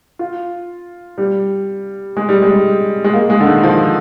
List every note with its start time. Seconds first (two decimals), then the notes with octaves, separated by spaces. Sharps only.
0.19 F4
1.18 G3
2.17 G#3
2.29 G3
2.42 G#3
3.04 G#3
3.13 A#3
3.30 G#3
3.40 D3
3.47 D#3
3.63 F3